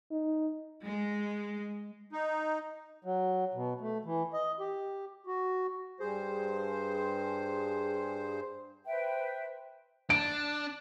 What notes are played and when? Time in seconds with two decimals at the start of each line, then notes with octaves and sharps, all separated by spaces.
0.11 D#4
0.83 G#3
2.12 D#4
3.04 F#3
3.54 B2
3.81 A3
4.05 E3
4.33 D#5
4.60 G4
5.26 F#4
6.00 G2 G#4 C5
8.86 B4 C5 E5 G5
10.10 D4 D7